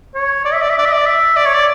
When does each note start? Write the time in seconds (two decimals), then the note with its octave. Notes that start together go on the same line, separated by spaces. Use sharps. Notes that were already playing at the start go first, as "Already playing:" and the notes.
0.15 C#5
0.45 D5
0.53 E5
0.61 D5
0.69 E5
0.78 D5
0.85 E5
0.93 D5
1.06 E5
1.36 D5
1.46 C#5
1.54 D5